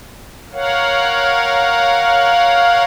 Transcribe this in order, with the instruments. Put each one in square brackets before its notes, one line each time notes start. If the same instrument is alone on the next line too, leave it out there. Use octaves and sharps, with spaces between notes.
[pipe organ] A#4 C#5 F5 F#5